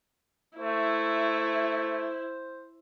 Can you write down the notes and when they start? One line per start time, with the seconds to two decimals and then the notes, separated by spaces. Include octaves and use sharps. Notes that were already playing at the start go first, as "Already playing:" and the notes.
0.58 A3 E4 C5